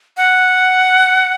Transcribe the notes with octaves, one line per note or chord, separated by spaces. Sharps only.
F#5